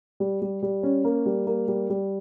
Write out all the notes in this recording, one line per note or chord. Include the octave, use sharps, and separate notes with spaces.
G3
G3
G3
C#4
A#3
G3
A#3
G3
G3